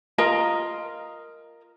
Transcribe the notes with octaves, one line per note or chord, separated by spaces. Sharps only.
F4 A#4 D#5 A#5